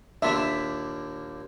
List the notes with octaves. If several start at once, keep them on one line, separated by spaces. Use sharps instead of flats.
D#2 A#2 D4 E5